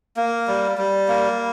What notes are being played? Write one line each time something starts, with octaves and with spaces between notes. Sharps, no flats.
A#3
G3
G3
A#3